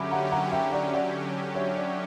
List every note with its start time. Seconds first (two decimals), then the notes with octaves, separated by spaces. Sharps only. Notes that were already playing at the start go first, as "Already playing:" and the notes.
Already playing: D3 F#3 C#4 G4 E5 B5 D6
0.11 F#5 A#5
0.32 F#5 A#5
0.52 E5 G5
0.72 D5 F#5
0.94 D5 F#5
1.54 C#5 E5
1.75 D5